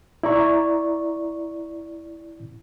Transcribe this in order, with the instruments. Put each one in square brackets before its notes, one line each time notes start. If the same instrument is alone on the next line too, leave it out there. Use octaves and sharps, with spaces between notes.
[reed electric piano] E4 D5 A#5 C#6